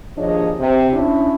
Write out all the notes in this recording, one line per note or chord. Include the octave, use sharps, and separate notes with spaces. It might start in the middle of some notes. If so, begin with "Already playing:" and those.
D#2 F3 D4 G#4 C#5 D#5
C3
C#4 D4 E4